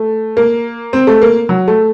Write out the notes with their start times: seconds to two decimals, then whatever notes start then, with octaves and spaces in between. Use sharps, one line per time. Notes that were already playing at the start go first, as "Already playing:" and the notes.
Already playing: A3
0.37 A#3
0.93 C4
1.07 A3
1.22 A#3
1.49 F#3
1.68 A3